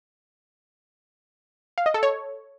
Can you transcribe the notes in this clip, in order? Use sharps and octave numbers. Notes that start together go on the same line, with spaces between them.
F5
D#5
A4
C#5